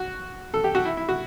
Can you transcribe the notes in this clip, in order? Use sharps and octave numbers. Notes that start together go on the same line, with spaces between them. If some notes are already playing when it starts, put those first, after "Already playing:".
Already playing: F#4
A4
G4
F#4
E4
E4
F#4